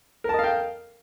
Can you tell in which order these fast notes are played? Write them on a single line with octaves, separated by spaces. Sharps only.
A#4 A5 D#5 F5 G5